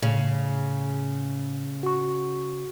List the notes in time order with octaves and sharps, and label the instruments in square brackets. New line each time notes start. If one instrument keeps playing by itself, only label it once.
[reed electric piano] A2 [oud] C#3
[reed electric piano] F#4 C#6